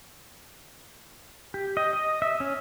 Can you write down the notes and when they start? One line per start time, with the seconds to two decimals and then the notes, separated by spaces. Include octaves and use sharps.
1.54 G4
1.77 D#5
1.93 D#5
2.22 E5
2.40 C#4